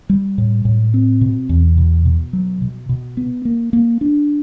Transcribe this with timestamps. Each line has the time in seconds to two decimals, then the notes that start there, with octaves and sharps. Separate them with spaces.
0.09 G3
0.38 A2
0.65 A2
0.94 C4
1.21 B2
1.49 E2
1.77 B2
2.05 B2
2.33 F#3
2.62 B2
2.89 B2
3.17 B3
3.45 A#3
3.73 A#3
4.01 D4